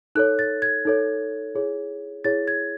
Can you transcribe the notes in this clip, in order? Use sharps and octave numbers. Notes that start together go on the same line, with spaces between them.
D#4 A4 C#5 F#6
A6
G#6
D#4 A4 C#5
E4 G#4 C#5
E4 G#4 C#5 A6
G#6